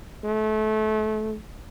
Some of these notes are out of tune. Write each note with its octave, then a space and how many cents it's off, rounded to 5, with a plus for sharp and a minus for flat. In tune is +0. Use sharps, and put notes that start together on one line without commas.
A3 -30